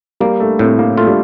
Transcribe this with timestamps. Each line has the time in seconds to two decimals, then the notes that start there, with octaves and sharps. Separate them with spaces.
0.20 G3 A#3
0.40 A3
0.59 A2 C4
0.79 A#3
0.97 A3 F4
1.07 G3